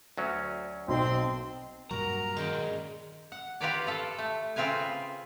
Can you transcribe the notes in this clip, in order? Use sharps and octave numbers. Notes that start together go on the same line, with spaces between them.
D2 F#3 C#4
B1 C4 C6
G2 A#2 F#3 F#4 A#4 A#5
D#3 G#3 C#4 G5
F#5
F4 G4 A#4 B4 C#5 D5
F4 A4
A3
C#3 C4 F4 B4 F5 G#5